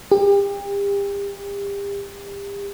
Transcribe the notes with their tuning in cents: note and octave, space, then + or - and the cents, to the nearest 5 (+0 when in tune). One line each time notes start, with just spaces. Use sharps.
G4 +35